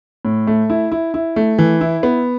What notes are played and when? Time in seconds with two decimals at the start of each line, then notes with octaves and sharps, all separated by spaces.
0.25 A2
0.47 A3
0.70 E4
0.92 E4
1.14 E4
1.36 A3
1.58 E3
1.81 E4
2.03 B3